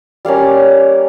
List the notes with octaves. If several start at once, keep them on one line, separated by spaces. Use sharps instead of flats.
G3 A#3 C#4 F5